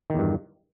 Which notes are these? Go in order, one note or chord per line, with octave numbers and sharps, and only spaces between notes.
E2 G2 D#3